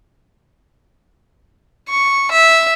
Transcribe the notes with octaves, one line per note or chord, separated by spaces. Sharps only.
C#6
E5